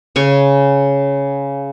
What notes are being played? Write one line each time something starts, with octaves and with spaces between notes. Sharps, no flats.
C#3 C#5 G#5